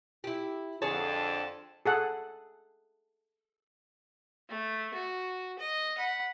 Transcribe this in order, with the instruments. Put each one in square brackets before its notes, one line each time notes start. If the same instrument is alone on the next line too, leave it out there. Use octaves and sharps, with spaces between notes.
[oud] E4 G4
[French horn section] F2 D3 [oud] G#4 C#5 [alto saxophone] A5
[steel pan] G#4 A4 F#5
[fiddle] A3
F#4
D#5
F#5 B5